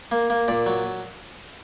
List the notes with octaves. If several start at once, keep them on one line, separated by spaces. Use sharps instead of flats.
A#3
A#3
A#2 D5
F#3